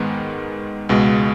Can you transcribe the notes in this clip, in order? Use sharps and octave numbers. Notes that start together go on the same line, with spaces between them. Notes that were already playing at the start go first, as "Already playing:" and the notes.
Already playing: G#2 D#3 G#3 B3
C#2 B2 G#3